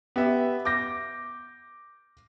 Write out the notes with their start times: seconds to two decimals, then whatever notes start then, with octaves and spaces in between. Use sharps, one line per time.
0.16 B3 G4 E5
0.65 D6 G6 A#6